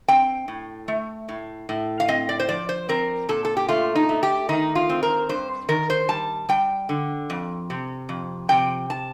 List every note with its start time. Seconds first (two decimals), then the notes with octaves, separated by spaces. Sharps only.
0.08 C4 G5
0.48 A2
0.88 A3
1.29 A2
1.69 A2
2.00 F5
2.09 C4 D#5
2.29 D5
2.40 C5
2.49 F3 D5
2.69 C5
2.89 C4 A#4
3.29 A#2 A4
3.45 A4
3.57 G4
3.68 A3 F4
3.95 D#4
4.09 A3
4.23 G4
4.49 D#3 D#4
4.75 F4
4.89 C4
5.03 A#4
5.29 G2 C5
5.69 D#3 A#4
5.90 C5
6.09 G3 A5
6.49 G3 G5
6.89 D3
7.30 F2
7.70 C3
8.09 F2
8.49 C3 G5
8.90 A5